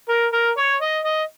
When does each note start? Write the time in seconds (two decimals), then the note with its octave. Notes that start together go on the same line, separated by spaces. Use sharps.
0.09 A#4
0.33 A#4
0.58 C#5
0.82 D#5
1.05 D#5